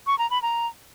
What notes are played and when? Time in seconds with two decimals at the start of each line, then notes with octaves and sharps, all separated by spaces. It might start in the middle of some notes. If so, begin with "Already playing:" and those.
0.07 C#6
0.19 A#5
0.30 B5
0.42 A#5